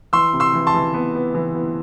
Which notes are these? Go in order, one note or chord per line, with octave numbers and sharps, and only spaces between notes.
E3 C6 E6
C3
C6 E6
E3
A5 C6
E3
B3
B3
E3
B3